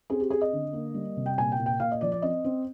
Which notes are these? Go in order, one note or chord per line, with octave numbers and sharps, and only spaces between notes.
C4 G#4
G4
C4 G#4
D#5
D3
A#3
G3
C3
G5
A#2 G#5
G5
A#2
G5
A#2 F5
D#5
F3 D5
D5
C4 D#5
C4